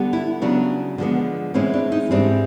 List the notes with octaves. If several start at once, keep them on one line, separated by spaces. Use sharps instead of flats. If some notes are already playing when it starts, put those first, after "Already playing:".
Already playing: D3 G3 B3
E4
C#3 F#3 B3 D4
D3 F3 G#3 B3
A2 E3 G#3 C4 C#4
D4
D#4
G#2 E3 G3 C4 D4